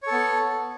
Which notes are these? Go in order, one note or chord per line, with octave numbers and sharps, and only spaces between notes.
B3 A4 C#5